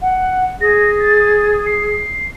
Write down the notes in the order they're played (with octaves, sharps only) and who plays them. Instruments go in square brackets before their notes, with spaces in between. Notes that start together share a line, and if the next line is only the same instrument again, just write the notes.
[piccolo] F#5
[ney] G#4 [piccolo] A#6
[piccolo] A6
C7